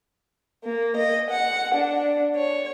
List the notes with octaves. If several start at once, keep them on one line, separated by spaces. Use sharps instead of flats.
A#3
D#5
F#5
D4
C#5